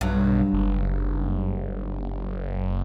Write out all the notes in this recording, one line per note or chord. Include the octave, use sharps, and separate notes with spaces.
B1 G2 F#3
F#1